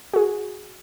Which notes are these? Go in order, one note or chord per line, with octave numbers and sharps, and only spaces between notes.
F#4 G#4